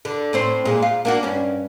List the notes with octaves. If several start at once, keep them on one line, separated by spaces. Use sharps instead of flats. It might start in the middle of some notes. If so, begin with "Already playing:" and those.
D3
A2 C4 C5
A#2 G#3
F4
A#3 D4 F#4
G2 C#4